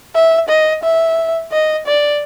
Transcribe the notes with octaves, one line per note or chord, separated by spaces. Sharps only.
E5
D#5
E5
D#5
D5